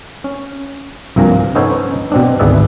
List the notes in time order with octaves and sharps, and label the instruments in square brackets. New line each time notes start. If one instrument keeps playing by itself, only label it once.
[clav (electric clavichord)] C#4
C2 G2 F3 A#3 G#5 A#5
B3 C#4 D#4 A4 C5 C#5
B2 C4 D4
G#1 D2 G#4 B4 D5 E5